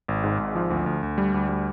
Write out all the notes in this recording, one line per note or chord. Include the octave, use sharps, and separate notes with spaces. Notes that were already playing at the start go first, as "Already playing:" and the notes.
G#1
G#2
G#1
F3
D2
D2
D2
G3
D2
G3